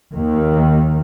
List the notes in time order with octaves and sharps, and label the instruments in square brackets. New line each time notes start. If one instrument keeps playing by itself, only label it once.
[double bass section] D#2 D#3